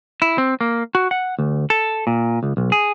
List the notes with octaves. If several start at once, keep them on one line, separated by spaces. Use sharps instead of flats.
E4
C4
A#3
F#4
F#5
D2
A4
A#2
C#2
B1
G#4